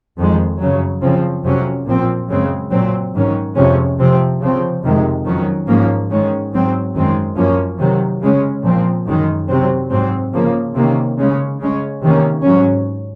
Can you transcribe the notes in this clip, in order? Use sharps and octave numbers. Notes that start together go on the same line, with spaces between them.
F2 D#3 G#3
F#2 C#3 F#3
C#3 F3 C4
F2 C3 F#3 C#4
A#2 F3 C4
F#2 C#3 G#3 C4
A#2 F#3 C4
G#2 D#3 F#3 C#4
F2 C3 F3 G#3 C#4
C3 F3 C4
C#3 F3 C4
F2 C3 D#3 G#3
F2 D#3 F#3 C#4
G#2 F3 A#3 C#4
G#2 D#3 G#3 C#4
G#2 F#3 C4
F#2 D#3 G#3 C4
F#2 F3 A#3 C#4
C3 D#3 F#3
C#3 G#3 C#4
A#2 F3 C4
F#2 D#3 G#3
C3 F#3 C4
G#2 F#3 C4
C#3 F3 A#3
C3 D#3 A#3 C#4
C#3 G#3 C#4
C#3 G#3 C#4
C3 D#3 A#3 C#4
G#2 F#3 C#4